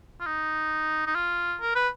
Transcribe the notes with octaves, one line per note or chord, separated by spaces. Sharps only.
F4
D#4
D#4
F4
A#4
B4